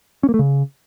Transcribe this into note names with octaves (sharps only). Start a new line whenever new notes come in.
C#4
A#3
A3
C#3